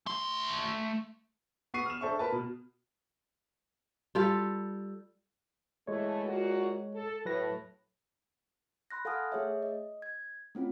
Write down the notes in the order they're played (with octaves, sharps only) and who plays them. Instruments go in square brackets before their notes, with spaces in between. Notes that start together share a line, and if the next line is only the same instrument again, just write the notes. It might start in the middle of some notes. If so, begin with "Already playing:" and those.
[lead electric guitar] A3 C6
[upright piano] B3 C#6 C7 D#7
F6 E7
D4 A4 C5 E5 C#6
A#4 B4 A5
B2
[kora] G3 F4 A4
[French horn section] E3 A3 [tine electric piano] G#3 C#5
[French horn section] A#2 F4 F#4
A4
[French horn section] A2 [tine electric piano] F#3 B4 A#6
[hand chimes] B5 C6 F#6 A#6
A4 F5 F#5 G#5 D#6 F6
A3 G#4 C#5 E5
D#5
G#6
A3 C4 C#4 F4